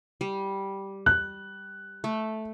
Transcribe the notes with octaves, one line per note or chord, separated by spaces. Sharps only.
G3
F#6
A3